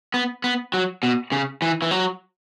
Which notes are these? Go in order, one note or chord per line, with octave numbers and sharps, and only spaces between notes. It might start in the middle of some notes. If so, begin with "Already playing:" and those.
B3
B3
F#3
B2
C#3
E3
E3
F#3